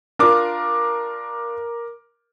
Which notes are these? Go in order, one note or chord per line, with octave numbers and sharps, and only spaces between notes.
D4 F4 A#4 D6